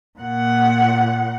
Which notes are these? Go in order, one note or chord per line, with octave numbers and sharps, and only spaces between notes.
A#2 F#5